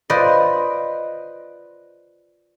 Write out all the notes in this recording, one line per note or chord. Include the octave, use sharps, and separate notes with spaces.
F4 B4 C5 D5 D#5